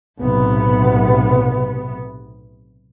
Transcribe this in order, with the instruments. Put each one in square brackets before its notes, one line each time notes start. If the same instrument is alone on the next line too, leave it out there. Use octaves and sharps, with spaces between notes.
[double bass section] B1 A2 C3 B3